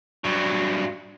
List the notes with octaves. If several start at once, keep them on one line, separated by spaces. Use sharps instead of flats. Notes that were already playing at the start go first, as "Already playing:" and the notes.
G2 F#3